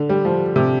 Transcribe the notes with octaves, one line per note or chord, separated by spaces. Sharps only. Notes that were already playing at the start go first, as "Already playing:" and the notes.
Already playing: D3
G3
F3
C3